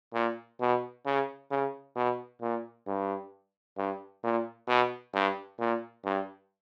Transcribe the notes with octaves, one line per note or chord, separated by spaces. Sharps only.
A#2
B2
C#3
C#3
B2
A#2
G2
G2
A#2
B2
G2
A#2
G2